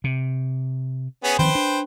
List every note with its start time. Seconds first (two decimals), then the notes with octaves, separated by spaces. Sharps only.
0.04 C3
1.24 B3 C#4 G#4
1.39 D#3 F3 C4 B4 C5 G5
1.55 D4